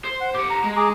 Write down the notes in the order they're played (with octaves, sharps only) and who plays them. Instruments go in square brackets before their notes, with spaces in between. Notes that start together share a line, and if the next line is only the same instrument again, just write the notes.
[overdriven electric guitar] C5
[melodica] F#5
[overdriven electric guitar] G4 F#5 [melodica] D6
[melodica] A#5
[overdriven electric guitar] G#3
[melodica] G#4 A#5 D6